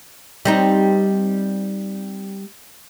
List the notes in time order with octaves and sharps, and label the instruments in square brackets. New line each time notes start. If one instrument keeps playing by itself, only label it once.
[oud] G3 C4 D#4